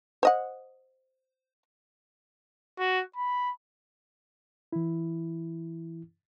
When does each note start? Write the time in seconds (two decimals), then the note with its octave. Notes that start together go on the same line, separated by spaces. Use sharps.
0.23 C5 D#5 F#5
2.79 F#4
3.16 B5
4.72 E3 E4